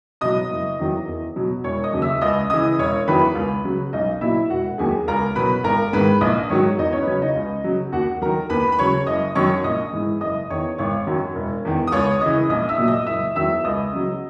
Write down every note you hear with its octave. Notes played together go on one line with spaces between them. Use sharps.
B2 F#3 D#5 D#6
F#1
E2 D#3 F#3
E2
B2 F#3
E1 C#5 C#6
D#5 D#6
D#2 C#3 F#3
E5 E6
C#2 D#5 D#6
C#3 E3 D#5 D#6
E1 C#5 C#6
E2 D#3 F#3 B4 B5
C#2
C#3 F#3
B1 D#4 D#5
A#2 F#3 E4 E5
E1 F#4 F#5
D#2 D#3 F#3 G#4 G#5
C#2 A#4 A#5
B2 F#3 B4 B5
G#1 A#4 A#5
G#2 D#3 B4 B5
A#1 D#5 D#6
G#2 D#3 F#3 C#5 C#6
E2 D#4 D#5
C#4 C#5
B4
C#3 F#3 C#4 C#5
D#4 D#5
C#2
C#3 F#3
D#2 F#4 F#5
D#3 F#3 A#4 A#5
D#2 B4 B5
B5
C#3 F#3 C#5 C#6
F#1 D#5 D#6
F#2 D#3 F#3 C#5 C#6
A#1 D#5 D#6
G#2 E3
F#1 D#5 D#6
E2 D#3 C#5 C#6
G#1 C#5 C#6
F#2 D#3 F#3
E1
E2 D#3
D#6
C#2 C#5 C#6
C#3 E3 D#5 D#6
A#1 D#5 D#6
E5 E6
A#2 F#3
D#5 D#6
F#1 E5 E6
E2 D#3 F#3 E5 E6
C#2 D#5 D#6
C#3 F#3